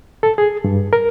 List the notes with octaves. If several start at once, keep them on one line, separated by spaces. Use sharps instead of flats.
A4
G#4
G2
A#4